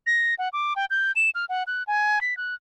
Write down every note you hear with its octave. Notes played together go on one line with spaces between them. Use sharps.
A#6
F#5
D6
G5
G6
E7
F6
F#5
F#6
G#5
B6
F#6